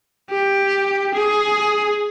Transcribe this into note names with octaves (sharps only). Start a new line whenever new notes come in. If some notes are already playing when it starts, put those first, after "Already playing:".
G4
G#4